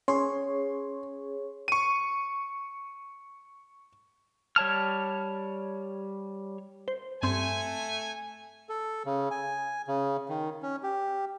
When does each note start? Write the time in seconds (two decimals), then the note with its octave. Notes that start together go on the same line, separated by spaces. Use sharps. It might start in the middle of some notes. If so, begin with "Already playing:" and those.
0.08 C#4 G#4 C#5 C6
1.68 C#6 D#7
4.56 G3 C#5 A5 F6
6.88 C5
7.23 G2 A3 C4 G#5 C6
8.69 A4
9.05 C#3
9.31 G#5
9.88 C#3
10.29 D#3
10.63 C#4
10.83 G4